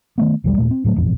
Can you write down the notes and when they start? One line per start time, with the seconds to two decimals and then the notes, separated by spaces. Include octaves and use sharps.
0.18 D#3 A3 B3
0.44 B1 E2 D#3 G3
0.57 D#1 A#2 A3
0.71 C4
0.84 A2 F#3 A3
0.96 E1 A1 F2